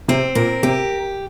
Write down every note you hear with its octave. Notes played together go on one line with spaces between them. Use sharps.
C3 C4
A#2 A#4
C3 G4